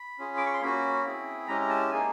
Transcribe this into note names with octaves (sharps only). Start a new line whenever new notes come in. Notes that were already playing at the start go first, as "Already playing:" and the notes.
Already playing: B5
C#4 F4 G#4
D6
C#6
C6
A#3 C#4 F#4 B5
C4 E4 G#4
G#3 C#4 E4 G4 A#5
A#5
A5
A#3 D#4 G#4 G#5